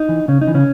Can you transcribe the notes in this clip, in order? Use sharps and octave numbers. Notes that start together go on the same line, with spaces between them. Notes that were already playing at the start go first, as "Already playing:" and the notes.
Already playing: D#4
E3
C#3 C#4
D#4
E3
C#3 C#4